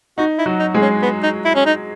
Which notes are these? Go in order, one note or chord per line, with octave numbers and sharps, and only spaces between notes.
D#4 F#4
E4
F#3 F#4
D#4
G#3 G#4
C#4
B3
D#4
E4
C#4
D#4